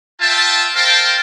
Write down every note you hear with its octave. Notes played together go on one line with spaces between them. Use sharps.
F4 E5 G5 A5
A4 A#4 C5 F5 G5 A5